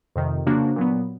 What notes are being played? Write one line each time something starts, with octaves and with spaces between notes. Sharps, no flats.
F2 C3 D#3
C#3 F3 A#3 D4 F#4
A#2 F#3 B3